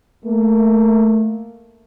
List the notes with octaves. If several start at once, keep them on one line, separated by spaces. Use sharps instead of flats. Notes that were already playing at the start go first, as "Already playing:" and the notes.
A3 A#3